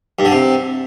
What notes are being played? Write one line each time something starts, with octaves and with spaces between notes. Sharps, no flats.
G2
D3
C3